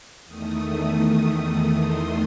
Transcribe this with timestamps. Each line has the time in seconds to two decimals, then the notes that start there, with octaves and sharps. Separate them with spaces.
0.25 E2 D#3 A3 D#6
1.75 C6